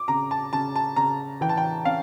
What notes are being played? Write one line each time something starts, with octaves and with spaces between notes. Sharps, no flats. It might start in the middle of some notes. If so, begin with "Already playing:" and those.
Already playing: D6
C#3 A#5
A5
C#3 A5
A5
C#3 A#5
E3 G5
A5
G5
C#4 F5